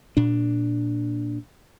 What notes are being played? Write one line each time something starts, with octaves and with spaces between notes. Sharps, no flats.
A#2 D4